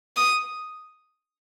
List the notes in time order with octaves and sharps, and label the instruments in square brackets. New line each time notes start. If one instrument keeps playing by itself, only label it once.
[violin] D#6